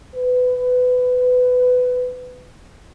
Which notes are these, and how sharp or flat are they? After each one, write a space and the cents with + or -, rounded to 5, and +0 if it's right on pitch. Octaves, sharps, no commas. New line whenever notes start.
B4 +20